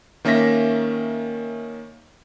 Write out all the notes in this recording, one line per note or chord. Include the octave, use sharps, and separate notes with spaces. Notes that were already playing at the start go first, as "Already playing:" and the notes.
D#3 A#3 C#4 E5 A#6 B6